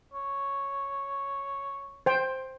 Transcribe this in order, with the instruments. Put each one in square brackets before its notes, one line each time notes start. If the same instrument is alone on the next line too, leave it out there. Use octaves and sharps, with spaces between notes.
[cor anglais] C#5
[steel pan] C5 G5